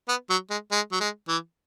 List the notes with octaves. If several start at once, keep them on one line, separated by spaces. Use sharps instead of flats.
B3
F#3
G#3
G#3
F#3
G#3
E3